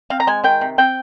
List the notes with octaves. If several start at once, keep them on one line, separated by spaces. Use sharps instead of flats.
C4 F5
A#5
G#3 G#5
D#3 G5
C3
C4 G5